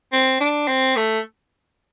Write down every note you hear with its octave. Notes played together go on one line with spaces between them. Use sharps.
C4
D4
C4
A3